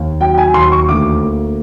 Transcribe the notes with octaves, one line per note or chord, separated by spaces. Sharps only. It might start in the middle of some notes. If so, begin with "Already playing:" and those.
Already playing: D#2
F#3 G5
G#5
D#2 C6
C#6
D2 D6
A#3